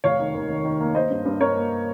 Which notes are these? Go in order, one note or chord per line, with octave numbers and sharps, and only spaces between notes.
F1 C#5 F5
D#3
D#2
D#3
D#3
A#3
A#3 C5 D#5
G2
G2
G2 A#4 C#5
A#3